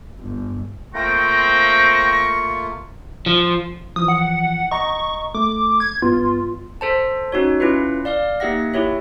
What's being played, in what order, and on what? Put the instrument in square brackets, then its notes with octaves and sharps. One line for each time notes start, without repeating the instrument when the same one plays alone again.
[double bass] G1
[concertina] A3 A#3 F4 [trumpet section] C4 G5 [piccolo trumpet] C#6 [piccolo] A#6
[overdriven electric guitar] F3
[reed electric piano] E3 F3 [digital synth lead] D#6
[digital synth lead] F#5
[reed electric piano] D#5 A#5 [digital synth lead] C#6
[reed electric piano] A3 [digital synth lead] D6
[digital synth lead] G#6
[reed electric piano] G2 B3 [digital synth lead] F4
[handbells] A4 C5 A5
C#4 D#4 F#4 C#5
C#4 E4 F4 B4
D5 F5 F6
A#3 D#4 G4 E5 F#5 A#6
E4 G4 C#5 E5